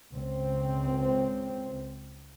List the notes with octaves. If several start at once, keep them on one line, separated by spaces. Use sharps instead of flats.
C#2 C4